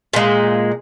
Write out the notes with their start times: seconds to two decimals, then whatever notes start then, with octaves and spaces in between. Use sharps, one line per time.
0.13 A#2 G#3